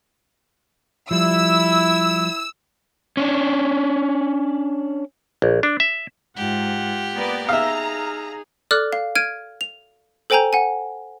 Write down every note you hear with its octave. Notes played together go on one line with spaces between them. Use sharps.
F3 G3 E4 E6
C#4 D4
A#1
D4
E5
G#2 F4 G4 F#5
A#3 B3 D5
D#4 G#4 E5 F5 A#5
A4 D5 D6 F6 F#6
F5
F6 G#6 D7 D#7
F7
A4 C5 G5 G#5 A#5 G6
F#5 G#5